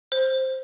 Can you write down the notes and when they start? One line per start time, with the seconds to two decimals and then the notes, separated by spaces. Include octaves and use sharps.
0.12 C5